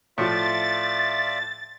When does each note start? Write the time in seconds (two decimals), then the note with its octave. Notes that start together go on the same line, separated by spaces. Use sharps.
0.18 A2 F3 F4 D5 E5 A6